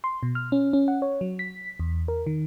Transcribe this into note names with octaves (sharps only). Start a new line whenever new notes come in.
C6
B2
F6
C#4
C#4
F#5
C#5
F#3
B6
E2
A#4
D#3